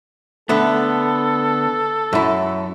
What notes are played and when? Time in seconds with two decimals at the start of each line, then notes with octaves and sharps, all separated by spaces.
0.49 D3 A3 B3 A4
2.13 F#2 E4